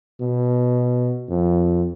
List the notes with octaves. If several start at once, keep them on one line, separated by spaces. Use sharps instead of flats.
B2
F2